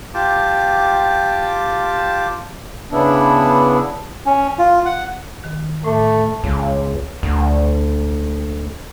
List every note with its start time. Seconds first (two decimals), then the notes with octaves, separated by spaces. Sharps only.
0.14 F4 G4 G5 A5 D6
2.92 C#3 B3 D4 E4
4.26 C#4
4.58 F4
4.85 F#5
5.44 D#3
5.84 A2 A3 D6
6.44 C#2
7.23 D2